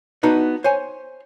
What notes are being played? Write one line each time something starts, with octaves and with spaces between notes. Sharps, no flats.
B3 D4 D#4 F#4 B4
C5 C#5 G#5